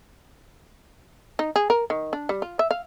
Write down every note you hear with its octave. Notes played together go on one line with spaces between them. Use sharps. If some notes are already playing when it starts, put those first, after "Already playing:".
D#4
G#4
A#4
D#3
D4
G3
F4
E5
F5